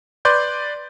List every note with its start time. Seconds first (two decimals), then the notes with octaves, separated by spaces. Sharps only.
0.25 B4 D5 C6 G6